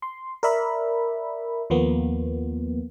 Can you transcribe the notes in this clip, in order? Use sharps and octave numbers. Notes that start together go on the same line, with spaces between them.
C6
A#4 D5 E5 B5
D#2 F3 A#3 B3